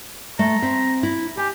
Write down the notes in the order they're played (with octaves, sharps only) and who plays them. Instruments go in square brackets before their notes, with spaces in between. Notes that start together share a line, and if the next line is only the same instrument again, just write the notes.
[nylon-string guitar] A3 [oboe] A#5
[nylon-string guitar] C4 E5
E4
[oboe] G4 [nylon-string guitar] G#5